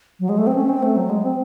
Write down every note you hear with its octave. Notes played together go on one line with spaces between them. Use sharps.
F#3
G#3
A3
C4
C#4
C4
A3
F#3
G#3
C4